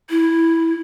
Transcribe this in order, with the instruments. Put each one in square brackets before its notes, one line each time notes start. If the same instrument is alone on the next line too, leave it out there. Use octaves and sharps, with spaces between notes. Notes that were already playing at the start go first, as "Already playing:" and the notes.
[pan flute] E4